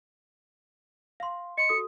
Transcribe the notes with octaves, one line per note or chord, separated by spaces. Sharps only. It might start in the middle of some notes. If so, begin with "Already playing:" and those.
F5 C6
D#5 C6 C#7
F#4 A4 D#6